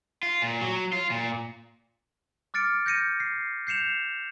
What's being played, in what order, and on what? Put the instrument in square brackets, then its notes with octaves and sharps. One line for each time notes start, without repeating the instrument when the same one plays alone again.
[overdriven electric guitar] F4
A#2
F#3
F4
A#2
[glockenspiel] D6 F6 A6 C#7 D7
G6 A#6 C#7 D#7
C7
G6 C7 C#7 E7 F7